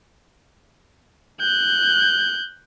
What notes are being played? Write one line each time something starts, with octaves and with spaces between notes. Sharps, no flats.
F#6 G6